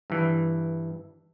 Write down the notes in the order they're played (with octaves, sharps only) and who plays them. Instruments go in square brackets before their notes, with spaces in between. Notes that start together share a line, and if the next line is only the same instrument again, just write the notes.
[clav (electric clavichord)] G2 E3